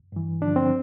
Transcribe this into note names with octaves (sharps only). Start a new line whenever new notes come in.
G2 E3
G2 D3 F3 D4
C4